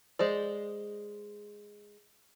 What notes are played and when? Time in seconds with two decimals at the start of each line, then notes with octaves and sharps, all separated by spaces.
0.19 G#3 C5 D5